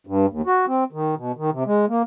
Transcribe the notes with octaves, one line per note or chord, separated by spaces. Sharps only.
G2
D#2
F#4
C4
D#3
B2
D#3
C3
G#3
A#3